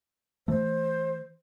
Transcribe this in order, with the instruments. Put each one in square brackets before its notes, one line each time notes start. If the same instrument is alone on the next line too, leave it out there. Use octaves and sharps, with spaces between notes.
[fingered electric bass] E3 A3 [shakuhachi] C5